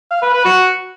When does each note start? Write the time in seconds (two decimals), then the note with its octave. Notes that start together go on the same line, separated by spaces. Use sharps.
0.11 F5
0.22 B4
0.33 B4
0.45 F#4